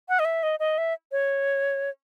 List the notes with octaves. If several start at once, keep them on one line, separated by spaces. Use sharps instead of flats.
F#5
D#5
E5
D#5
D#5
E5
C#5